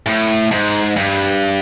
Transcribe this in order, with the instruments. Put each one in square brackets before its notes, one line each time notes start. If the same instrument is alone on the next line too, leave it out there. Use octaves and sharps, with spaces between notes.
[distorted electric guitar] A2
G#2
G2